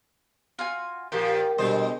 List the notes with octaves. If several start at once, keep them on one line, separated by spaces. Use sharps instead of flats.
F4 F#4 G#5
A#2 F3 G4 A#4 G5
B2 D3 G3 G#3 C5 D#5